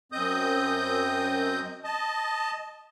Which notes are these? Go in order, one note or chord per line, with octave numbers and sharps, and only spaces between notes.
F#2 C4 D#5 D#6 G6
D#5 A5